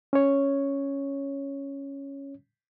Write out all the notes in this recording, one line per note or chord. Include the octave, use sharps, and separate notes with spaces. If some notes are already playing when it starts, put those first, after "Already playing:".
C#4 C#5